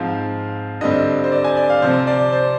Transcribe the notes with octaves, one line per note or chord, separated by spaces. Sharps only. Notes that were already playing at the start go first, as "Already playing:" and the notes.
Already playing: G#2 F3 C4 F5
G2 D3 G3 C4 D#5
C5
D5
G#5
D5
F5
C3 F3 C4 C5
D5
C5